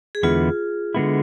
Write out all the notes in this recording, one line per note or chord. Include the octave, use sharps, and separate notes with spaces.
G#4
E2 D3 G#3 B3 E4 F4
D3 G#3 B3 E4